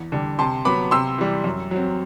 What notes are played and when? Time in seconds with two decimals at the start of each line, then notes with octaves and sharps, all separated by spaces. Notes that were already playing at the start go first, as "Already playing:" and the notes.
Already playing: E2
0.12 D3 G3
0.39 C3 A5 C6
0.65 F#3 B3 B5 D6
0.91 C3 C6 E6
1.18 E3 G3
1.44 F#2
1.71 F#3 C4